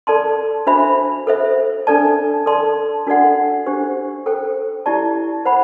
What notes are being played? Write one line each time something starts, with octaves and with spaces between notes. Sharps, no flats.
A4 D5 A5 C6
D4 F#4 C5 E5 B5
A4 C5 E5
D4 A4 D5 A5
A4 D5 A5 C6
D4 F#4 A4 D5 F#5
D4 G4 C5
A4 C5 G5
E4 G4 D5 A5
C5 F#5 B5